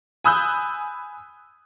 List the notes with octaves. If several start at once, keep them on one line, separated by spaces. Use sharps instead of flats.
G#5 B5 D#6 E6 F#6 G6